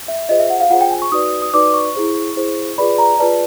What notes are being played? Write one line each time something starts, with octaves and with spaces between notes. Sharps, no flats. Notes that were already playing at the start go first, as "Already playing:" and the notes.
E5
F4 G#4 C5 D#5
E5
F#5
F5
F4 G#4 C5 F#5
G5
G#5
C#6
D#4 F#4 B4 D5 D#6
D#6
D#4 F#4 B4 D5 D6
C#6
E4 G#4 C5
E4 G#4 C5
F4 G#4 B4 D5 B5
A#5
F4 G#4 B4 D5 A5